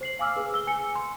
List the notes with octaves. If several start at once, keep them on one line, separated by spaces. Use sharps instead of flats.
C5 C7 F#7
F5 G#5 D6 E6 F6
G#4 B4
E6 G7
G#5 C#7
C6